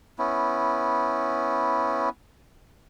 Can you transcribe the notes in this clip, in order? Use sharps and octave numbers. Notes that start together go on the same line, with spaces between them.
B3 C#4 E4